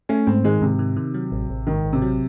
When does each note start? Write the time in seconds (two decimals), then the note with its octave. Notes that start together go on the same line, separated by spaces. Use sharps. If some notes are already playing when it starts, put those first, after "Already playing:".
0.09 A3 C#4
0.27 G#2 C4
0.44 D#3 G#3
0.62 G#2 C3
0.79 D#3
0.97 D#3
1.14 F#3
1.32 A1
1.50 A1
1.67 G#2 D#3
1.84 A1
1.93 C3
2.02 F#3